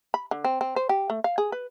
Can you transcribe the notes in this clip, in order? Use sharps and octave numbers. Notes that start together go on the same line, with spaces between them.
B5
D3
C4
C4
C5
G4
A3
F5
G#4
B4